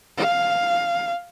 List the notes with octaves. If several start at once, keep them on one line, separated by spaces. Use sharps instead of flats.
F5